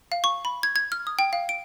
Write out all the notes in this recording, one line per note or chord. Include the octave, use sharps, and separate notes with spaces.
F5
C#6
B5
G#6
G#6
F6
D#6
G5
F5
D7